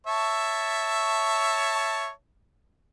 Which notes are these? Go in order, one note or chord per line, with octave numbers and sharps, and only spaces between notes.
C#5 E5 A5